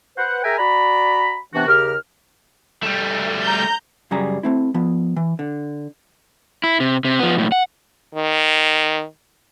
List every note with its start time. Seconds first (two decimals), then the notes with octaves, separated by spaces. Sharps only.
0.17 B4 C5 F#5
0.44 G#4 A#4 E5 G5 G#5 A#5
0.59 F#4 D5 A#5 B5
1.54 C3 E3 B3 D4 F#4
1.67 D#2 C#3 G4 A#4 F6
2.83 G3 A3
3.42 A#5 G6
4.11 F#2 C#3 G3 G#4 A#5
4.43 A3 C4 E4
4.74 F3 B3
5.16 E3
5.39 D3
6.64 E4
6.80 C3
7.05 C3
7.19 F3 B3
7.36 B1 A2
7.52 F#5
8.15 D#3